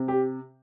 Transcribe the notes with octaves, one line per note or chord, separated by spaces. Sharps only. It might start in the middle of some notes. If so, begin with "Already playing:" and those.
Already playing: C3
G4